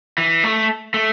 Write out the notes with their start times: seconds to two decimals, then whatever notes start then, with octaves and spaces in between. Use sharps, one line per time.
0.18 E3
0.44 A3
0.94 A3